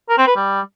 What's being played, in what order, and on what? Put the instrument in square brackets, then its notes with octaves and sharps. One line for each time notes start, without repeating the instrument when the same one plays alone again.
[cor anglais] A#4
C4
B4
G3